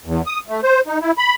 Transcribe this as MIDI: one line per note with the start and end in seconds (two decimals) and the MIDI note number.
0.06 0.22 40
0.26 0.40 87
0.48 0.61 57
0.63 0.81 72
0.87 0.98 63
1.01 1.12 64
1.18 1.35 83